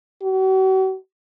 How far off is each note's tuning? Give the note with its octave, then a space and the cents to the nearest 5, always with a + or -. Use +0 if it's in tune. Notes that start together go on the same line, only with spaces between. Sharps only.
F#4 +45